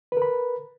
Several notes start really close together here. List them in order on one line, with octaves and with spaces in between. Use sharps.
B4 A#4 B5